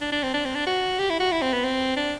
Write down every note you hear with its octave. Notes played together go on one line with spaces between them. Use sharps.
D4
D4
C4
D4
C4
D4
F#4
G4
E4
F#4
E4
C4
B3
C4
D4